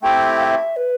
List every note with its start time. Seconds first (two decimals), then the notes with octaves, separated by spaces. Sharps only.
0.02 A3 C4 E4 G4 G5
0.39 F5
0.44 E5
0.76 B4